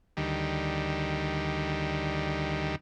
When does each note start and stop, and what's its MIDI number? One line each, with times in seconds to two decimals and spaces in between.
0.17 2.76 38
0.17 2.76 51
0.17 2.76 55